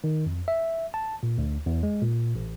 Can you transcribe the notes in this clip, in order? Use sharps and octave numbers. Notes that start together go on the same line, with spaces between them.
D#3
F2
E5
A5
A#2
D2
E2
G#3
A#2
A1